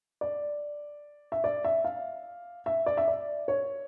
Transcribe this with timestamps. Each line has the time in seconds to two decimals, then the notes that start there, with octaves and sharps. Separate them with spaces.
0.21 D5
1.32 E5
1.44 D5
1.64 E5
1.84 F5
2.66 E5
2.86 D5
2.97 E5
3.08 D5
3.48 C#5